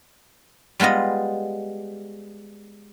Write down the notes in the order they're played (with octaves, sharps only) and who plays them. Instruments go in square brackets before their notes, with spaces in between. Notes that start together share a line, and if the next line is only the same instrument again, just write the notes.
[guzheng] G3 G#3 B3 F4 D#5